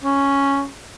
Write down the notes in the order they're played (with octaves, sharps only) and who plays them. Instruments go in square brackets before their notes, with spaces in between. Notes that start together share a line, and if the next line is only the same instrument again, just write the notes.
[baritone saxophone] C#4